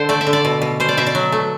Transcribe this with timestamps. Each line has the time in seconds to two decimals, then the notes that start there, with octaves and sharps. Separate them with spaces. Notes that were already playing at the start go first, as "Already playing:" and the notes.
Already playing: D3 A4 C5
0.09 A3 D5
0.21 E5
0.27 D3
0.33 D5
0.45 B2
0.62 B2
0.80 B2 C5
0.89 D5
0.97 B2 E5
1.07 D5
1.15 F#3
1.32 A3